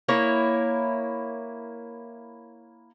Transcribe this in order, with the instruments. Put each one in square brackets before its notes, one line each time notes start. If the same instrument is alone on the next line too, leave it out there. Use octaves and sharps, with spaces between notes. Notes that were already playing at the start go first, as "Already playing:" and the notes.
[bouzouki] A#3 E4 C#5